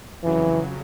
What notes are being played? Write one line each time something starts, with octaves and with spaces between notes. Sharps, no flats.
F2 C#3 E3 F#3